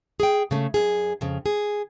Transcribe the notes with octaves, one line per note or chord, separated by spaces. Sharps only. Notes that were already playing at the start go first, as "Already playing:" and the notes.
G#4 G5
C#3 A3
F#2 G#4
F2 C#3
G#4